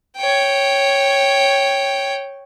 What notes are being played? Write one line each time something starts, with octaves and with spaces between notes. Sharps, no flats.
C#5 G5